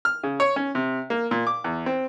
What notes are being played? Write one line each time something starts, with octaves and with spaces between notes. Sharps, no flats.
F6
C#3
C#5
C#4
C3
A#3
A#2
D6
E2
C4